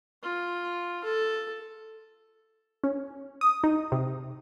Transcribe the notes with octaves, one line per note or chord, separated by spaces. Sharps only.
F4
A4
C#4
D#6
D#4
C3